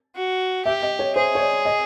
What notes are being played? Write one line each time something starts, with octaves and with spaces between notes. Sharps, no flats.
F#4
G4 E5
D#5
C#5
G#4 C5
C#5
D5
D#5